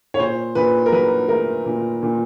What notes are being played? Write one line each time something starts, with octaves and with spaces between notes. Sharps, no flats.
C#5
A#2 C5
A#2 B4
A#4
F#3 B4
A3 A#4
A#2
A#2